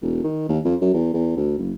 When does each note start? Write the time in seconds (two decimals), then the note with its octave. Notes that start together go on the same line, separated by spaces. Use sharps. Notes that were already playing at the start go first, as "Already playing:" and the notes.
0.02 E1
0.24 D#3
0.49 D#2
0.65 F2
0.81 F#2
0.94 E2
1.13 E2
1.37 D2
1.58 F#1